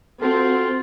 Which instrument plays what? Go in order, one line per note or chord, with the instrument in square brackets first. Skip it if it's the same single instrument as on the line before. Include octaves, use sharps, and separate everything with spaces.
[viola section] C4 [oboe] F4 [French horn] F#4 [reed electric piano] A4